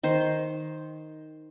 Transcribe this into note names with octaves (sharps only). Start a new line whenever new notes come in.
D#3 C5